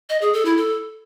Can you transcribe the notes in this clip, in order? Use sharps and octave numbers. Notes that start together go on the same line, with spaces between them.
D#5
G#4
A4
E4
A4